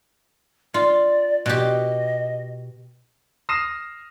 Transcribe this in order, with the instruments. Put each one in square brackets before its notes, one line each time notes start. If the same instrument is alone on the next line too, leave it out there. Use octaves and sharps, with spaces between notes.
[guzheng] F4 [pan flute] D5
[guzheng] B2 G4 [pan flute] D#5
[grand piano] D#6 F6 A#6 C7 E7